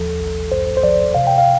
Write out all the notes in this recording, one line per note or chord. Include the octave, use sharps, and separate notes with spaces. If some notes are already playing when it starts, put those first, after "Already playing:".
Already playing: D#2 F3 A4
A1
G2 C5
C5
F3 D5
C3 F5
G5
F5